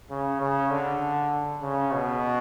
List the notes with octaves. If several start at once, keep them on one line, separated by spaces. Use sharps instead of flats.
C#3
C#3
D3
C#3
B2